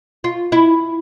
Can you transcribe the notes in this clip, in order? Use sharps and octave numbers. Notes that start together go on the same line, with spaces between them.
F4
E4